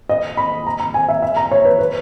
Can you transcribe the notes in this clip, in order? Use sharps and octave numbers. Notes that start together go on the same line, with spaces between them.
D#5
B5
A#5
A#5
G#5
E5
E5
A#5
C#5
B4
B4